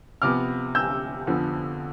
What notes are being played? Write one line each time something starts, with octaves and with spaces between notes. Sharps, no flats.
C3 F3 B3 D6 F6
E6 G6
F2 D3 F3 B3